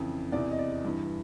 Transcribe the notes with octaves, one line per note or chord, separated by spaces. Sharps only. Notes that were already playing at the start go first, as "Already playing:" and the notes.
Already playing: F2 C#3 E3
E2 C3 E3 D5
D#5
D5
G2 E3